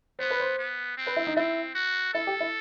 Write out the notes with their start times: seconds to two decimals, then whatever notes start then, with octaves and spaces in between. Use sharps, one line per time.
0.19 B3 C5
0.30 B4
0.40 C5
0.58 B3
0.97 C4
1.07 B4
1.16 E4
1.27 D#4
1.36 C4 E4
1.75 F#4
2.14 E4 A4
2.27 G4
2.40 E4